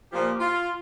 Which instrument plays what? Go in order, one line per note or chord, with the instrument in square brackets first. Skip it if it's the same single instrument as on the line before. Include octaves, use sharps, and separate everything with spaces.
[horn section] A#2 F3 G4
F4